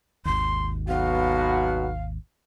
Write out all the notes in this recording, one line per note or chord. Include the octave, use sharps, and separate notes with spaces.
G#1 D#2 C6
B1 B3 F#4 F5